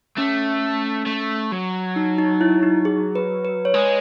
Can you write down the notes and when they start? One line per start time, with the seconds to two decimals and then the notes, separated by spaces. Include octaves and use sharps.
0.17 A3 C#4
1.06 A3
1.52 F#3
1.96 D#4
2.18 D#4
2.41 E4
2.63 D#4
2.85 G#4
3.15 B4
3.45 B4
3.65 C#5
3.74 G#3 B4